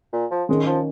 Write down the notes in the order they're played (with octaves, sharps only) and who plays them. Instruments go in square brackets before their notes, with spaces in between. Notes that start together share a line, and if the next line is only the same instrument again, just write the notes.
[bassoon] A#2
F3
[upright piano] D#3 C#4 [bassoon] G#3
[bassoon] F3